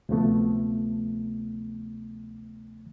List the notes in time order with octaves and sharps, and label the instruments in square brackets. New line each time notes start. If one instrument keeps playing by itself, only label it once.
[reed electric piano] D2 C3 F3 A3 B3